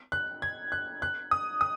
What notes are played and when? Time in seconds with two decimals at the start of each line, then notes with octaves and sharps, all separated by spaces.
0.12 F#6
0.42 G#6
0.72 F#6
1.02 F#6
1.31 D#6
1.61 D#6